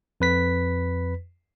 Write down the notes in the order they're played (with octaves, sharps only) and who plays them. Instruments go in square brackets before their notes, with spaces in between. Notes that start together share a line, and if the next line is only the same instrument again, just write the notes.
[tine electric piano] F2 B4 B6